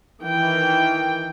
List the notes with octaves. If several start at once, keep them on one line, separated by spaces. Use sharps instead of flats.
D#3 E3 G5